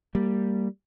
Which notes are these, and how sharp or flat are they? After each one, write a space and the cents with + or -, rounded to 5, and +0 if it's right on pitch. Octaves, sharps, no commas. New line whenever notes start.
G3 +0 A#3 -20